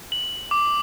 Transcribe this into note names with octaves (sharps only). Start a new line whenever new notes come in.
F#7
D6